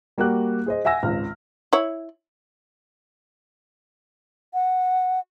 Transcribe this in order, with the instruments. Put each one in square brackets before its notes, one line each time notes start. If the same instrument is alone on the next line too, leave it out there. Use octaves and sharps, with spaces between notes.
[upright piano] G3 A#3 F#4 G4 F#6
G#4 C5 D#5
E5 F#5 G#5 E6 A#6
G#1 C#2 F6
[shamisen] E4 C#5
[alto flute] F#5